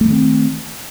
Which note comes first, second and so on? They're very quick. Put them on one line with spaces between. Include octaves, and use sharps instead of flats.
A3 E3 D#3 C4